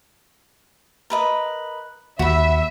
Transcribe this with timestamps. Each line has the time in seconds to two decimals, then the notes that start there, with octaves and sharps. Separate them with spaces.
1.10 A#4 B4 D#5
2.19 D#2 D#3 A#3 F#4 E5 B5